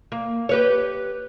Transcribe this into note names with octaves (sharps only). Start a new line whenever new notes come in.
A#3
G4 B4 C#5